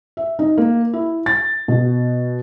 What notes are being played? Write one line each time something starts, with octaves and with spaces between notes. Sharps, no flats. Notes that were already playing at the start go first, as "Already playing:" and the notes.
E5
D#4
A#3
E4
A6
B2